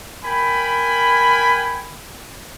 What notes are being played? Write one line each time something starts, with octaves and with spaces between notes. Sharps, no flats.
A#4 G5 G#5 B5